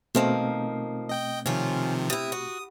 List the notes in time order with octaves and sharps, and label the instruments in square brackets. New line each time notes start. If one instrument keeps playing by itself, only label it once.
[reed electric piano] B2 A3 C4 [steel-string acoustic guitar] D#3 F3 A#3
[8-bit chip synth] D#5 G5 G6
[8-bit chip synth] C3 D#3 F3 [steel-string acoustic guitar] C#4 F4
[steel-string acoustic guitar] C3 E4 [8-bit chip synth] D#6
[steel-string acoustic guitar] F#4